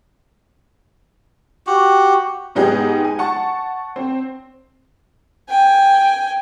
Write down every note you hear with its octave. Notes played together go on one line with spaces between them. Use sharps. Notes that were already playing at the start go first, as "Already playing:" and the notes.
F#4 G4
G#2 B3 D#4 G4 G#4
G#5
F#5 A5 C#6
C4
G5 G#5